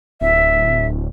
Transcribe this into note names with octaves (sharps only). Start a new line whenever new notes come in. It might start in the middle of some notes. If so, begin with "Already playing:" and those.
D1 E5